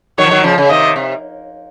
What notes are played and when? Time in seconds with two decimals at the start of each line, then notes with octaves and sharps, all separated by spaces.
0.18 D#3 F#3 C#5
0.26 F3
0.31 D#3 F#3
0.44 C#3 F3
0.58 C#3
0.70 C3 D#3 D#5
0.96 C3